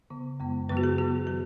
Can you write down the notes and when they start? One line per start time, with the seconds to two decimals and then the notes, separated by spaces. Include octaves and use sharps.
0.10 C#3 B3
0.40 F#2 C#3 G#3 B3
0.69 F#2 C#3 F#3 B3 B4
0.77 F#4
0.83 G#4
0.98 C#3 B3 F#4
1.27 D#3 F#3 G#4